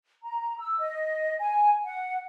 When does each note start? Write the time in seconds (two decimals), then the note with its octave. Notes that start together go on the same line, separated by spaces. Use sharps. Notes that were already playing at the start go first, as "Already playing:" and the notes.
0.23 A#5
0.59 E6
0.78 D#5
1.40 G#5
1.84 F#5